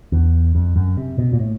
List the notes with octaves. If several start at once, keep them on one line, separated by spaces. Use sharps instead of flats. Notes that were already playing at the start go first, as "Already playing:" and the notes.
E2
F2
F#2
C3
B2
A#2
A2